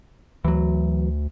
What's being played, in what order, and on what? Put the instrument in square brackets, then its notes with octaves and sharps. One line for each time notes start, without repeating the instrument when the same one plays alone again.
[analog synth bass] D2 [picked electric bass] E3 F#3